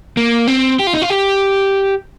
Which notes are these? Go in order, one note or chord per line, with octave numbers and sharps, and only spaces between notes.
A#3
C4
G4
F4
D#4
F4
G4